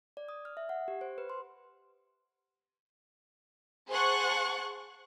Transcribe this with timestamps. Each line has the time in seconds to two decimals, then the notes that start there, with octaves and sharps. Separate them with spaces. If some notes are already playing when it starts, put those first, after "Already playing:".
0.17 D5
0.29 D#6
0.45 F6
0.57 E5
0.69 F#5
0.88 G4
1.01 C5
1.18 B4
1.30 C6
3.89 G#4 C5 F#5 A5 C#6 F#6